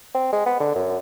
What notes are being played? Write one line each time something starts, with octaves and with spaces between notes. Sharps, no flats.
C4
G#3
B3
D3
F#2